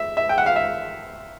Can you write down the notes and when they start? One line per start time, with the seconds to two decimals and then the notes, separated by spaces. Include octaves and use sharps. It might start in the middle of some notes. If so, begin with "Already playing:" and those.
Already playing: E5
0.17 E5
0.29 G5
0.38 F#5
0.46 F5
0.56 E5